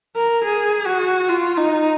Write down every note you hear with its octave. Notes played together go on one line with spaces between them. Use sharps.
A#4
G#4
F#4
F4
D#4